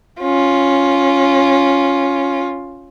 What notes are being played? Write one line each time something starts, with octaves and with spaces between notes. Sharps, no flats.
C#4 F4